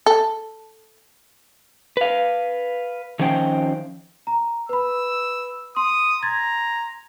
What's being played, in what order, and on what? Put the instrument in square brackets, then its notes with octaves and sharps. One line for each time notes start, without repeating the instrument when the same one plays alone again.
[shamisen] A4
[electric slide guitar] B4 F5
D#3 F3 C#4 C5 G5
[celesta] A#5
[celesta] B4 B5 [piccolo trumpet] E6
[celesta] C6 [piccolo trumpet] D#6
[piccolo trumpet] A#5 [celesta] C6 G#6 A6